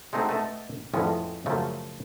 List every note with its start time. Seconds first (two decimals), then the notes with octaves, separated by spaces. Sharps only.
0.13 G#3 A3 C4 D#4 F#4
0.29 A3 B3 D#5 A5
0.94 F2 A2 G#3 B3 C#4
1.46 F#2 C#3 F3 A3